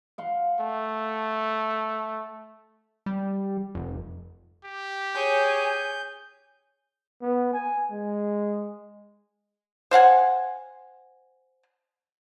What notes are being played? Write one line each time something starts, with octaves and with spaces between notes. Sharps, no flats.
F5 F#5 C6
A3
G3
F1
G4
G#4 C#5 G#5 G6
B3
G#5
G#3
C5 F5 F#5 G#5